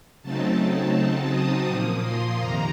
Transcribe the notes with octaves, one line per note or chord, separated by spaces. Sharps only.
C#3 F#3 A3 C4 D#4 A5
C#3 F#3 C4 D#4
D#6
A#2 F3 A#3
C6
F2 C3 D#3 A#3 A#5